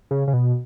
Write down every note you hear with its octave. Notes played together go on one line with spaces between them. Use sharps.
C#3
C#3
B2